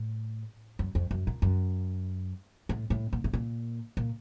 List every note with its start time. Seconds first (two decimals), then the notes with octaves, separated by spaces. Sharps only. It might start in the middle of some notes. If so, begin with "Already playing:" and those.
Already playing: A2
0.79 F#2
0.95 F2
1.11 F#2
1.27 A#2
1.42 F#2
2.69 A2
2.90 A2
3.13 A#2
3.24 A2
3.33 A#2
3.97 A#2